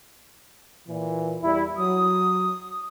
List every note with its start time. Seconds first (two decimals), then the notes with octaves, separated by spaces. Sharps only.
0.87 A#2 E3
1.42 E2 G3 E4
1.77 F#3 D#6